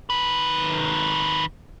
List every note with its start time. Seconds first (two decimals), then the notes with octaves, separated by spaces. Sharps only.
0.10 D#3 B4